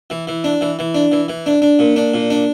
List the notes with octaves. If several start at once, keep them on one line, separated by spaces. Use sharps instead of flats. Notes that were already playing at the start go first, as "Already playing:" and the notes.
E3
E3
D4
E3
E3
D4
E3
E3
D4
D4
A#2
D4
A#2
D4